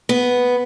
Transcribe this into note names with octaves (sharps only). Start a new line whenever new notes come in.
B3